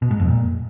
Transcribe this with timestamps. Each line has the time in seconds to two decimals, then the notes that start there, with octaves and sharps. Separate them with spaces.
0.02 B2
0.11 G#2
0.19 F2
0.28 A#2